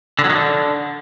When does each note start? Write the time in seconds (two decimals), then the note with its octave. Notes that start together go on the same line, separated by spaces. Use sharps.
0.19 D3
0.24 F#3
0.30 D#3
0.35 D3